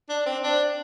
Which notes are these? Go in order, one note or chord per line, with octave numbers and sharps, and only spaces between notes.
D4
C4
D4